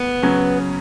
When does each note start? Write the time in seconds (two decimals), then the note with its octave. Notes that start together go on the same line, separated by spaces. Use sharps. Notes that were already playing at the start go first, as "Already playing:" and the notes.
Already playing: B3
0.23 C#3 F#3 C#4